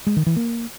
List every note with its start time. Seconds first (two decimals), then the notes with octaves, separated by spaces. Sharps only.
0.07 G#3
0.17 D#3
0.26 E3
0.36 A#3